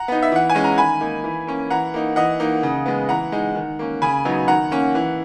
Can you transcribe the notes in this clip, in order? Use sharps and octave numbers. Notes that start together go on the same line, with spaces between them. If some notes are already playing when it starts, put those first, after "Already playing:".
Already playing: F#5 A#5
B3 D#4
E5
E3 F#5
G#5
G#3 C#4
A#5
D#3 G#5 B5
A#3 D#4
E3
A#3 C#4
E3 F#5 A#5
A#3 D#4
E3 D#5 F#5
A#3 D#4
C#3
G#3 B3
E3 F#5 A#5
G#3 D#4
D#3
A#3 C#4
C#3 G#5 B5
F#3 B3 D#4
D#3 F#5 A#5
A#3 C#4
E3